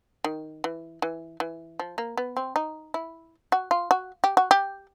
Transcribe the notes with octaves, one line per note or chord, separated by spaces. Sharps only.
D#3
E3
E3
E3
F3
A#3
B3
C4
D#4
E4
F#4
F4
F#4
G4
F#4
G4